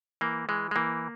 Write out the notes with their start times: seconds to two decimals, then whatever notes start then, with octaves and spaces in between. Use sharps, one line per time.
0.21 E3 A#3
0.49 E3 G#3
0.71 G#3
0.76 E3 A#3